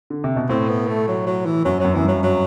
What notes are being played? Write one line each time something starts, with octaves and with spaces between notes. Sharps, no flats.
D3
C3
B2
A2 C4
B3
A3
F#3
F#3
E3
F#2 F#3
F#2 F#3
F#2 E3
G2 F#3
F#3